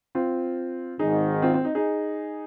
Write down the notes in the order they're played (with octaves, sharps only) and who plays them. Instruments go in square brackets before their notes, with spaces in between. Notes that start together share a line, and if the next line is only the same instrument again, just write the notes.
[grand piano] C4 F4
[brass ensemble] G#1 G#2 D#3 [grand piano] D#4 G#4
[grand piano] C4 F4
C4
D#4
D#4 G#4